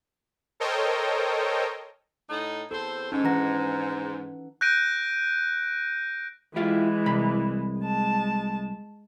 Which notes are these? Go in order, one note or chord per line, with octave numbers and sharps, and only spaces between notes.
A4 A#4 C5 C#5 D#5 G5
A2 D#4
E2 C4 A4 C5
G#2 C#4 D#4
E3 D4 F#5 A#5 A#6
F#6 G6 A#6 D7 D#7
E3 G#3 E4 F4 G4
C2 B5
G#3 A5